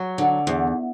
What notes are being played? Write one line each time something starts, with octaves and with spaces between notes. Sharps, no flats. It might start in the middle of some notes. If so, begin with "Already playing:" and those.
Already playing: F#3
D3
E2